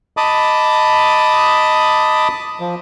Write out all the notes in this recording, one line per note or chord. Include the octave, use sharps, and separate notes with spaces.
D#5 A5 B5 D6 D#6
F3